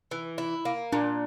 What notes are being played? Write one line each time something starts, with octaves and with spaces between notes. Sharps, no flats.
E3
E4
A#3
A#2 D4